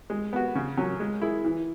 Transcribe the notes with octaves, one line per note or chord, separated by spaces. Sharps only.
G#3
B3 F#4
C#3
F#3 C#4
G#3
E4 G#4
E3